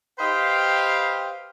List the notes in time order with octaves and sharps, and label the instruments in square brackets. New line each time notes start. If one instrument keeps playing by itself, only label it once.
[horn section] G4 B4 C5 D#5 F5 G5